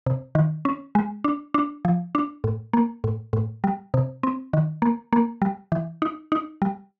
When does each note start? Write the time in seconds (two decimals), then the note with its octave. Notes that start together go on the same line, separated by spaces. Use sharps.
0.06 C3
0.35 D#3
0.65 C#4
0.95 G#3
1.24 D4
1.54 D4
1.85 F3
2.15 D4
2.44 A2
2.73 A#3
3.04 A2
3.33 A2
3.64 G3
3.94 C3
4.23 C4
4.53 D#3
4.82 A#3
5.13 A#3
5.42 G3
5.72 E3
6.02 D#4
6.32 D#4
6.62 G3